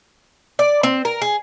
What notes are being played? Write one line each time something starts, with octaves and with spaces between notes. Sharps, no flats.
D5
C4
A#4
G#4